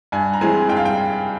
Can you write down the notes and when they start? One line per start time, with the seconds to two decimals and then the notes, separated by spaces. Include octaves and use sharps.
0.12 G2 G#5
0.33 A#5
0.41 E3 G#3 C4 G#5
0.69 G2 G5
0.77 F5
0.85 G5